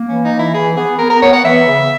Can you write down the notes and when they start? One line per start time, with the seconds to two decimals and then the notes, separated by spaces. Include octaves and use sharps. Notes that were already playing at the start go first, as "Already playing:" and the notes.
Already playing: A#3
0.09 E3 C#4
0.25 D#4
0.32 E3
0.39 E4
0.54 E3 G#4
0.77 B3 G#4
0.99 B3 A#4
1.10 A#4
1.22 B3 C#5
1.33 F#5
1.45 E3 E5
1.67 C#3